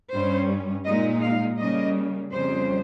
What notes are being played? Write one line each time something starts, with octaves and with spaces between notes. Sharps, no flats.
G2 G3 C#4 C5
A#2 G#3 D#4 D#5
F5
C#3 G3 A#3 D#5
F2 C#3 G3 C5